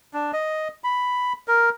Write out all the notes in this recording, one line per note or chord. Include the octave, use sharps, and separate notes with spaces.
D4
D#5
B5
A#4